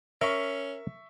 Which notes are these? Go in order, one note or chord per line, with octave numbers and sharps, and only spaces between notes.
C#4 A#4 E5 C#6